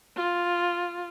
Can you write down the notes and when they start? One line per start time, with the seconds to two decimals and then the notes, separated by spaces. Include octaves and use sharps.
0.16 F4